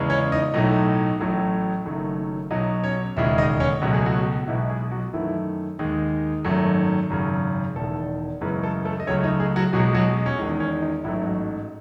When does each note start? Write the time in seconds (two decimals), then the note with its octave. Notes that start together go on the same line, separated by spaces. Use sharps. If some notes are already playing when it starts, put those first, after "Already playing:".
Already playing: E2 C#3 E3 G#3
0.10 C#4 C#5
0.32 D#4 D#5
0.54 B1 A2 F#3 A3 D#4 D#5
1.20 A1 A2 F#3 A3
1.85 F#1 F#2 D#3 F#3 A3
2.51 B1 B2 F#3 D#4 D#5
2.84 C#4 C#5
3.16 E1 D#2 C#3 G#3 E4 E5
3.38 D#4 D#5
3.60 C#4 C#5
3.82 C#2 B2 F#3 A3 F#4
3.94 G#4
4.05 F#3 F#4
4.48 B1 B2 E3 G#3 E4
4.69 G#3 G#4
4.92 F#3 F#4
5.13 F#2 D#3 E3 A3 E4
5.79 D#2 D#3 G#3 D#4
6.45 G#1 F#2 D#3 F#3 A3
7.10 G#1 F#2 C#3
7.76 E1 E2 D#3 A3 A4
8.41 F#2 C#3 E3 G#3 B3 B4
8.63 A3 A4
8.85 A3 A4
9.00 D#5
9.07 C#2 C#3 F#3 A3 C#4 C#5
9.23 D#4 D#5
9.40 G#3 G#4
9.56 F#3 F#4
9.73 B1 B2 F#3 G#3 F#4
9.95 F#3 F#4
10.26 C#4
10.38 G#3 D#4
10.41 E2 D#3
10.60 C#4
10.82 D#4
11.04 A1 G#2 E3 F#3 A3 E4
11.26 F#3 F#4